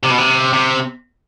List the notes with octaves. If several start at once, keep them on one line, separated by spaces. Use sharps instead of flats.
C3
B2
C3
C3